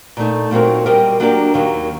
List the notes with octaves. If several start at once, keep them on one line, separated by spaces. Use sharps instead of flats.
A#2 A3 D#4
A#2 F#3 C4 F#4 A#4
G3 C4 G4 A#4 D#5
F#3 A#3 D4 G4 A#4
D#2 D#3 F#3